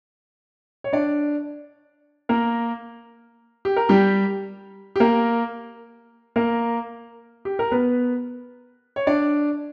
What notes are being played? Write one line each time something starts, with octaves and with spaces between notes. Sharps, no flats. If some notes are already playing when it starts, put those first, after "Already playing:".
C#5
D4 D5
A#3 A#4
G4
A#4
G3 G4
G4
A#3 A#4
A#3 A#4
G4
A#4
B3 B4
C#5
D4 D5